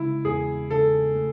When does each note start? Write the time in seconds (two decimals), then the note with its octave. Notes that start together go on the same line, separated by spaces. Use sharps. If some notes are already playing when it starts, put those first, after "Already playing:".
Already playing: C#3 G#3 E4
0.25 E2 G#4
0.70 C#3 A4
1.15 A3